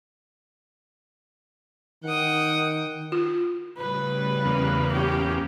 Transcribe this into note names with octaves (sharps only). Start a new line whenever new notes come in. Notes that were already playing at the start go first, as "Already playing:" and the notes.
D#3 F#5 G5 D#6
F4
A2 C#3 G3 B4
E2 A#3
C#4 G4